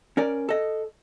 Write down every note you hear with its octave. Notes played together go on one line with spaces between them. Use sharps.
C#4 A#4 D5
A4 D#5